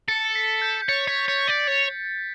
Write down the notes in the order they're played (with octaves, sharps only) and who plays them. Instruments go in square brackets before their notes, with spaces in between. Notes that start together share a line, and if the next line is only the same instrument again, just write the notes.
[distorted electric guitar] A4 [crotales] C#7
[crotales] C#7
B6
G6
G6
[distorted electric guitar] C#5 [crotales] A6
[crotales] C#7
[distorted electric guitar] C#5 [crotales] B6
[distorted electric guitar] C#5 [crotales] C#7
[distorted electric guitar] D5 [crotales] B6
[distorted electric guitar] C#5 [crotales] A6